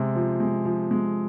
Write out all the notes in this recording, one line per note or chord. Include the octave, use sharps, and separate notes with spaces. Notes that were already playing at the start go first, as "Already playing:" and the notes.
Already playing: C3 G#3
F3
G#3
F3
G#3